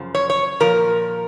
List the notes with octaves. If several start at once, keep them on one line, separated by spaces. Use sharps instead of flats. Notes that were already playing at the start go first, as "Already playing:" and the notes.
Already playing: F#2 C#3 F3
C#5
C#5
A#2 F3 A#4